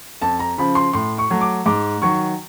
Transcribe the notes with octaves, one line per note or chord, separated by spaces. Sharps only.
F2 A5
A#5
C#3 F3 B5
C6
A2 C6
C#6
F#3 A3
D6
G#2 D6
D#3 F#3 C#6